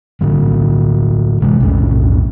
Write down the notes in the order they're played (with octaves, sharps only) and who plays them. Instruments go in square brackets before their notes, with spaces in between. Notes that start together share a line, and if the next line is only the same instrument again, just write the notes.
[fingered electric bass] A2 D3 G3
C3 E3 G#3
B1 F2 A2 C#4